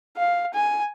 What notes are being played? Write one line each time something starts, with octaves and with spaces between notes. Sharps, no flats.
F5
G#5